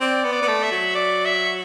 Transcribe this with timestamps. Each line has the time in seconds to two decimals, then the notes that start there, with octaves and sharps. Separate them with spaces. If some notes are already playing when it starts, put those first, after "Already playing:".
0.01 C4 D5
0.24 B3
0.32 D5
0.42 B3
0.48 A3
0.63 E5
0.72 F#3
0.95 D5
1.25 E5